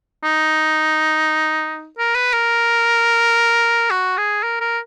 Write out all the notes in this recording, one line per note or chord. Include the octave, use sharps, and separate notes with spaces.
D#4
A#4
B4
A#4
F#4
G#4
A#4
A#4